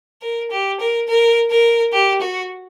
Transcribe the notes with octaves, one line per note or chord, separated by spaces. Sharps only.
A#4
G4
A#4
A#4
A#4
G4
F#4